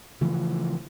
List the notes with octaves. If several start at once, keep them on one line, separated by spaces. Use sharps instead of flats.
C#3 E3 F3 A3